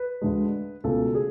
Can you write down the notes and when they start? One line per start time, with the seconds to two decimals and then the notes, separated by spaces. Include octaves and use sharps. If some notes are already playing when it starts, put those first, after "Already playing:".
Already playing: B4
0.22 D2 D3 G#3
0.84 C#2 B2 A3 A4
1.15 G#4